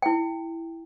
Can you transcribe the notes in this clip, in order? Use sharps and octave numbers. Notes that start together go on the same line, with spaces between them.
E4 G5